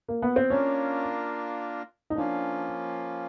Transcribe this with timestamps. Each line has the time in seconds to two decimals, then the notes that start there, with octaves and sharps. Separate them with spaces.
0.08 A#3
0.22 B3
0.36 C4
0.50 A#3 C#4 D4 F4 A#4
2.10 D#4
2.16 F3 A#3 C#4 D4 F4